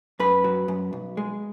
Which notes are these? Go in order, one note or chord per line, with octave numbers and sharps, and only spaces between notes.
F#2 B4
F#3
F#2
B1
G#3